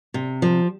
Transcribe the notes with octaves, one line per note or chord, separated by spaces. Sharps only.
C3
F3